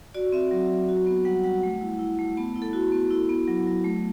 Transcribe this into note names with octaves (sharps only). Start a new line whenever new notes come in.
F#4 D5
C4 E5
F#3
F#3
F#4
B3
G3 F#5
G3 F#5
A3
E4
E4
A3
B3 A5
E4
A4
E4 F#4
B3
E4
B3
F#3
F#3
A3